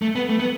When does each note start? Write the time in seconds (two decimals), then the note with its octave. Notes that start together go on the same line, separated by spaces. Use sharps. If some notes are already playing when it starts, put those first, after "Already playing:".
0.02 A3
0.15 B3
0.29 A3
0.39 B3